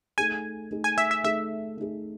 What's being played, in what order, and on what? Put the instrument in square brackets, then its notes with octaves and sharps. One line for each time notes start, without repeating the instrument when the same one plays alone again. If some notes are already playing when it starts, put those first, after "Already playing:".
[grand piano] A3 D#4 G#4 [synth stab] G#5
[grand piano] A3 D#4 G#4
[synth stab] G#5
E5
E5
[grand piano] A3 D#4 G#4 [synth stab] E5
[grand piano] A3 D#4 G#4